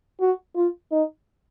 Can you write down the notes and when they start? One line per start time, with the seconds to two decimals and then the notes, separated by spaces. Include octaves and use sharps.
0.21 F#4
0.55 F4
0.92 D#4